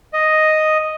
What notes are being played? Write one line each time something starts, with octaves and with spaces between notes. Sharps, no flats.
D#5